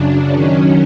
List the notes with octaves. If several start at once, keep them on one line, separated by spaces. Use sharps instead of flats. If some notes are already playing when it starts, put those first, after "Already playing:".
Already playing: F#2 C#3 F#3 D4
F#2 D#3 F#3 C#4